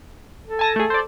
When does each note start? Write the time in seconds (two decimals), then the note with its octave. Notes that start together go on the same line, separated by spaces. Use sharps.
0.45 A4
0.59 G#5 A5 A#6
0.76 A3 G#4
0.90 C5 D5